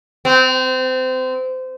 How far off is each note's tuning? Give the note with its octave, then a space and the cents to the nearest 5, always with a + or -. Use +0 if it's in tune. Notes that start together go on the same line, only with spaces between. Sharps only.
C4 -25